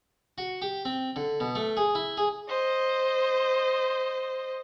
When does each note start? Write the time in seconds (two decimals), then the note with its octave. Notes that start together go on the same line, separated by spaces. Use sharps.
0.38 F#4
0.62 G4
0.85 C4
1.16 D3
1.40 B2
1.55 A3
1.77 G#4
1.95 E4
2.17 G#4
2.49 C5 D#5